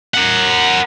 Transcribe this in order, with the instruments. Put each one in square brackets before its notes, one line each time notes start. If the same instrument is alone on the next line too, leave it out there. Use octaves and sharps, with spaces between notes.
[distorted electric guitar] A#4 F#5